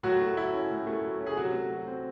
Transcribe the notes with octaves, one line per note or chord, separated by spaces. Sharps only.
A2 F#3 F#4
A3
F#3 E4
C#4
A2
A3
F#3
C#4
G#4
C3 F#3 F#4
A3
F#3
C4